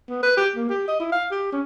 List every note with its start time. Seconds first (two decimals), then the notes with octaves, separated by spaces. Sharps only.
0.09 B3
0.23 B4
0.37 G4
0.56 A#3
0.69 G4
0.88 D#5
1.00 E4
1.12 F5
1.31 G4
1.52 C#4